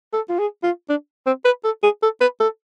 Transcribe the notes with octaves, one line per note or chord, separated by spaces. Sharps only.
A4
F4
G#4
F4
D4
C4
B4
A4
G#4
A4
B4
A4